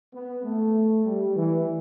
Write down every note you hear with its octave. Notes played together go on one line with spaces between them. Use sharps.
B3
A3
G3
E3